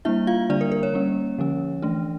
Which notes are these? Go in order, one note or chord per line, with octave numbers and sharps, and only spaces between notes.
G3 A#3 D4 E4 E5
F4 F5
D3 G3 A#3 D4 D5
A#4
A#4
C#5
G3 A#3 C#4
D3 F3 C#4
E3 A3 D4